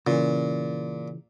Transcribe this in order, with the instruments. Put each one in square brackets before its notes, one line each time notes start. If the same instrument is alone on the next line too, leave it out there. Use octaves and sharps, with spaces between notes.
[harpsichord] A#2 [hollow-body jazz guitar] C#3 E3